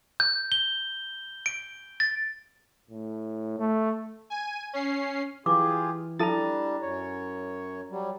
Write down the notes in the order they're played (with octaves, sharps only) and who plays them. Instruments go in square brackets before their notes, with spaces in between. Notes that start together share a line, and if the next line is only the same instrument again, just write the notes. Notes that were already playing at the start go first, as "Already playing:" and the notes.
[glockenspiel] G6
G7
D7
A6
[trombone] A2
A3
[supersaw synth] G#5 D#7
C#4 C7
[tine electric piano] E3 [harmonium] F4 G4 G#4 [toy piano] D6
[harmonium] G3 D4 [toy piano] E4 A4 A5 [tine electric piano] A#5 A6
[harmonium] F#2 C#5
F#3 G3